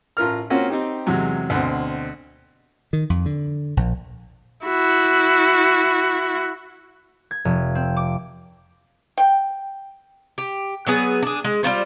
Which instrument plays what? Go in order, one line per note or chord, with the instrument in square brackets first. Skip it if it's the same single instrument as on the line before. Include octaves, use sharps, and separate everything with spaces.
[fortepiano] A1 F4 A#4 F6
A#3 C4 C#4 F4 F#4
C4 D#4 G4
E2 C3 F#3 G#3
D2 B2 C4
[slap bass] D#3
F2
D3
A#1
[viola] E4 F#4
[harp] G#6
F1
C4
D6
[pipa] G5
[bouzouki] G4
F#3 B3 G#4
D4 G#4
G#3
G3 E4 F4 C5